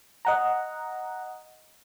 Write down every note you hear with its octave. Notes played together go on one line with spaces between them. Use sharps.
D#5 F#5 A#5